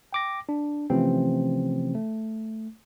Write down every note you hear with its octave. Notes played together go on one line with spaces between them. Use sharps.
G5 D6 A#6
D4
C3 E3 F3 A3 C4 C#4
A3